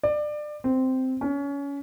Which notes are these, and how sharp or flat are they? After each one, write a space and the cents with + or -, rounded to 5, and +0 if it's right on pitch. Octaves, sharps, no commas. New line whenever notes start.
D5 +25
C4 -10
C#4 +25